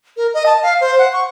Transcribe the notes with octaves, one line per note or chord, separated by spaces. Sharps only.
A#4
D#5
A5
F5
C5
F#5
C#6